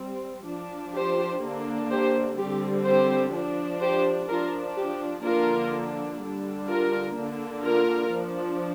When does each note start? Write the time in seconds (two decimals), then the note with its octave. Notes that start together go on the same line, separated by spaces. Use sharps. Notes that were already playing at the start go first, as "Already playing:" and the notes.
Already playing: G3 C4
0.47 F3 D4
0.95 G4 C5
1.42 D3 A#3 D4
1.90 G4 C5
2.37 D3 G3 C4 G4
2.85 G4 C5
3.34 F3 D4
3.81 G4 C5
4.29 F3 D4 F4 A#4
4.77 G4
5.24 D3 F3 A#3 D4 F4 A#4
6.20 D3 G3 D4
6.68 F4 A#4
7.15 D3 A#3 D4
7.63 F4 A#4
8.11 F3 D4